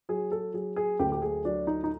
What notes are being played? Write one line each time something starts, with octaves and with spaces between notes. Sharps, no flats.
F#3 G#4
A4
F#3 G#4
G#4
D2 G4
G4
G#4
F#3 D4
D#4
D#4